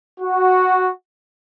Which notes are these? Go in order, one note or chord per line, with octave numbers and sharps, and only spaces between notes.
F#4